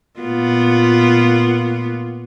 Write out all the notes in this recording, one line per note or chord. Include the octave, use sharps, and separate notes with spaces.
A#2 B3 F4